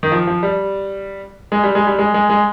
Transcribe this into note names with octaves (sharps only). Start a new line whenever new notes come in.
D#3
F3
F3
G3
G#3
G3
G#3
G3
G#3
G#3
G#3